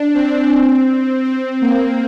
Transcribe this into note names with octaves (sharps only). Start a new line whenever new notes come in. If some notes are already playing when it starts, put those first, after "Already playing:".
Already playing: D4
C4
C4
A#3